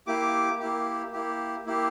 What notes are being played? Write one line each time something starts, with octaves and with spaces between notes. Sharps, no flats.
A#3 E4 G4 D6
A#3 E4 G4
A#3 E4 G4
A#3 E4 G4